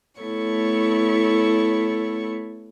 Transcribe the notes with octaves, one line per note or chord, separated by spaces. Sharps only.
A3 B3 E4 A4 C#5 C#6